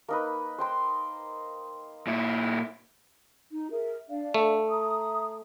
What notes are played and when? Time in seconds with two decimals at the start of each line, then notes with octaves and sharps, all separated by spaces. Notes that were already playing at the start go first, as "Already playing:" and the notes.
0.08 A#3 D#4 B4
0.58 C5 G5 C6
2.07 A#2 E4
3.52 D#4
3.72 G#4 A#4 E5
4.09 D4 D5 F5
4.34 A3
4.69 E5 A#5 D#6